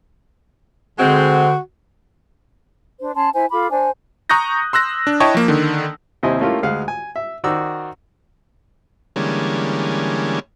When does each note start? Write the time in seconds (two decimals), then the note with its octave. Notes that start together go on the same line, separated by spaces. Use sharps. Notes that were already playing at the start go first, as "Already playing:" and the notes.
0.99 D3 G#3 C4 F#4
3.01 D4 C5
3.15 C#4 A5 C6
3.35 E4 C5 G#5
3.52 F4 A4 B5 D6
3.70 D4 C5 G#5
4.30 A#5 C#6 D#6 F#6 G6 A#6
4.73 C6 E6 F#6 A#6
5.07 D4
5.20 E4 C#5 D#5 G5 A5 C#6
5.34 F3 A#3
5.48 D3 D#3
6.23 D#2 C3 E4 C5 D#5 G#5
6.40 A3 A#3 C#4 E4 F4 G4
6.63 D2 G#3 F5 F#5
6.88 G#5
7.16 E5
7.44 D#3 F#4 C5 D5 A#5 E6
9.16 D3 E3 G3 G#3 A#3 C#4